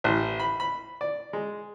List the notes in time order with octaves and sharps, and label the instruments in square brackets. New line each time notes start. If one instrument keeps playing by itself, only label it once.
[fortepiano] A1
B5
B5
D5
G#3